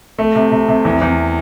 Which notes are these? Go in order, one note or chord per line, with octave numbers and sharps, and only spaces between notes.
A3
C3
C3
C3
E2
E2